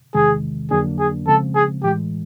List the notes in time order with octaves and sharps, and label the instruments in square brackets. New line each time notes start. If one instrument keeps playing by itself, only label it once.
[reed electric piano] E2 C3 D#3 G#3 [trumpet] G#4
[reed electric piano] F2 D3 F#3 A#3 D4 [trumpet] G#4
[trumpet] G#4
[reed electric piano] C#3 F3 G#3 C4 [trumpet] A4
[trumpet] G#4
[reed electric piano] A2 E3 G#3 [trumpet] G4